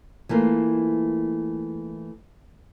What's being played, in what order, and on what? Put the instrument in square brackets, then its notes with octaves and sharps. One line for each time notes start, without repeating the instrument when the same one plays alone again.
[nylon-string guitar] E3 A3 A#3 F4